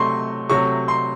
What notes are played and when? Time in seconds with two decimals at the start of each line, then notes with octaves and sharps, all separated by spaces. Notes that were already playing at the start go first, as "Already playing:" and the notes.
Already playing: C3 F#3 A3 C6 C#6
0.50 C3 F#3 A3 C#6
0.88 C6